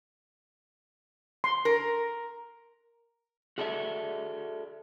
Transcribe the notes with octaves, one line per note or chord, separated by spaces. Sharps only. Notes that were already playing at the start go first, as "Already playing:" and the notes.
C6
A#4
F#4 G#4 A4 D5 E5